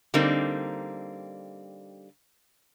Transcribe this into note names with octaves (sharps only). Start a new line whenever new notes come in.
D3 G3 A#3 C4 D#4